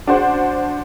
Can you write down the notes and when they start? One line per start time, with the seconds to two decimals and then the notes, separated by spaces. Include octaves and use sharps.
0.07 D4 F#4 C5